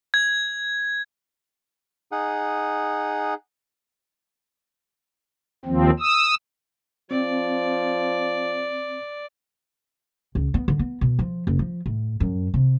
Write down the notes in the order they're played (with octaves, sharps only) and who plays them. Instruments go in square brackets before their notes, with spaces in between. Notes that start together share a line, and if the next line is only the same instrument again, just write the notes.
[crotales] G#6
[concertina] D#4 G#4 F#5
[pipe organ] D#2 F3 C4
D#6 E6
[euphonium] F3 [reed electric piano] C4 [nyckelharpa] D5
[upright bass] C#2
B3
D3
B3
B2
F3
F#1
F3
A2
F#2
C3